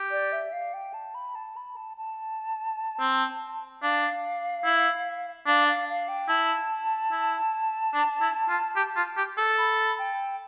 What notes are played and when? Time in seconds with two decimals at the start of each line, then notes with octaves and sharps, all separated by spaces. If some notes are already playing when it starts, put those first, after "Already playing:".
Already playing: G4
0.11 D5
0.33 E5
0.53 F5
0.74 G5
0.94 A5
1.15 B5
1.35 A5
1.57 B5
1.76 A5
1.97 A5
3.00 C4
3.83 D4 F5
4.64 E4
5.47 D4 F5
5.68 F5
5.89 F5
6.09 G5
6.29 E4 A5
7.12 E4
7.94 D4
8.21 E4
8.49 F4
8.76 G4
8.96 F4
9.17 G4
9.38 A4
9.58 B5
9.99 G5